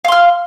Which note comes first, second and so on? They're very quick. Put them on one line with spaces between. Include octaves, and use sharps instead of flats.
F5 C6 F6